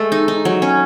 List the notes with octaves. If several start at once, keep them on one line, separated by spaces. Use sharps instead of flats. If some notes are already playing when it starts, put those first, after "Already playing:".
Already playing: G#3 A3 A4
D#4
D#4
F#3
C#4